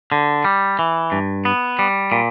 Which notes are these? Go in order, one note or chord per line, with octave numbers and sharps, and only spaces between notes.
D3
G3
E3
G2
B3
G3
A#2